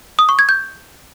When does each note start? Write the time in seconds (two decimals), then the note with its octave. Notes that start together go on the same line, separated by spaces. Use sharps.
0.19 D#6
0.29 C#6
0.39 G#6
0.49 G6